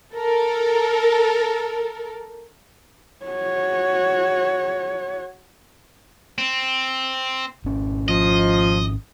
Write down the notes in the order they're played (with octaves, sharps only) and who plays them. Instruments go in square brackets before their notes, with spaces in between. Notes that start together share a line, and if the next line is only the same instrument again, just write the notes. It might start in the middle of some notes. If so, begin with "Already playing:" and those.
[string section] A4 A#4
[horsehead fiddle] F#4 C#5
[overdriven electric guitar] C4
[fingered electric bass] G#1 C#4
[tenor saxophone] F3 [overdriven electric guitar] D#5